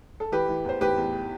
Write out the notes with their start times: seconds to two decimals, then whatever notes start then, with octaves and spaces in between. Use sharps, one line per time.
0.20 A4
0.32 E3 G4 B4
0.49 E3
0.65 E2 C5
0.81 E2 G4 B4
0.97 E2